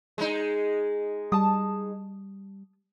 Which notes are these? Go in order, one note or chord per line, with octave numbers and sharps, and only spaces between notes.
G#3 D#4
G3 A5 D#6